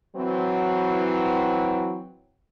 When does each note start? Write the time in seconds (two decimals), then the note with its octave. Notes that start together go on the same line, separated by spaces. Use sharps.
0.16 E3 F#3 C4